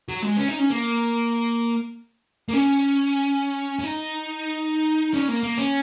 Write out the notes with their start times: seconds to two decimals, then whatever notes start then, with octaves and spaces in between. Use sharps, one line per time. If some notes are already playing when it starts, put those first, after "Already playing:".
0.09 F#3
0.22 G#3
0.37 C#4
0.48 D#4
0.59 C#4
0.70 A#3
2.49 A#3
2.53 C#4
3.79 C#4
3.84 D#4
5.14 C#4
5.29 A#3
5.43 A#3
5.58 C#4